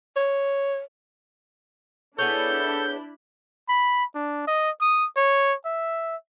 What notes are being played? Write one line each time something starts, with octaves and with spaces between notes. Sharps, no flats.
C#5
B3 D4 E4 G#4 A4 C#5 B5 G6
B5
D4
D#5
D#6
C#5
E5